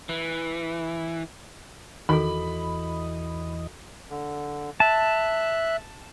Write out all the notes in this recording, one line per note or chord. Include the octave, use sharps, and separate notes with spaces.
E3
E2 D#3 E3 F#4 A4 D#5 B5
D3
E5 A5 F#6